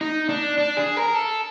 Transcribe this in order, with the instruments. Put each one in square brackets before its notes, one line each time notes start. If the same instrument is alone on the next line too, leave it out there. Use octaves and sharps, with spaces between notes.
[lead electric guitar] D#4
D4
D4
G#4
A#4
A4